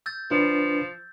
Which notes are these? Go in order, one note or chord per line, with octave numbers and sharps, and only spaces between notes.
E6 G6 A6
F3 D4 F4 B4